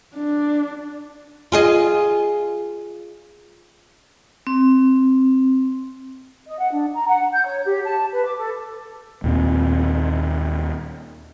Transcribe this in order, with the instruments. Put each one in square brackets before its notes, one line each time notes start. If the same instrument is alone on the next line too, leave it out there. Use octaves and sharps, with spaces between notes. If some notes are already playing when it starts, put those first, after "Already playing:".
[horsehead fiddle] D4
[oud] F4 G#4 D#5
[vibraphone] C4
[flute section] D#5
F#5
D4
A#5
F#5
G6
C#5
G4
A5
B4
D6
A4
[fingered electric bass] D#2 A#2 C4